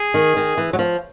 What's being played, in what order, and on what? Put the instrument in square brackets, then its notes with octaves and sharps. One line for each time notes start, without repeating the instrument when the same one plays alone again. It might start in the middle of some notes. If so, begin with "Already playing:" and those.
Already playing: [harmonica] G#4
[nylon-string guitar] D#3
D#3
E3
F#3
F3